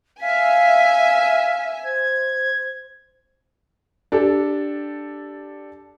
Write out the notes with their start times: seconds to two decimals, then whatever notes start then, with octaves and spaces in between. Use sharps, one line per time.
0.21 E5 F5 G#5 B6
1.84 C5 G#6
4.12 D4 G4 A4